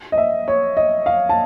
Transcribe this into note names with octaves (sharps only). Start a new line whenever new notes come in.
D#5
E5
C#5
D#5
F5
A5